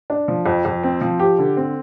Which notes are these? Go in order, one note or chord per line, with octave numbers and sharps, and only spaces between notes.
D4
F3
F2
F2
C4
F3
G4
D3
C4